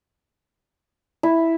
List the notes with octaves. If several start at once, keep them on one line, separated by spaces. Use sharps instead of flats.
E4